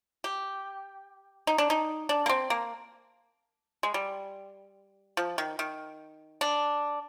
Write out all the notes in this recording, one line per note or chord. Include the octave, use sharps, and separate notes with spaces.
G4
D#4
D4
D#4
D4
A#3
C4
A#3
G#3
G3
F3
D#3
D#3
D4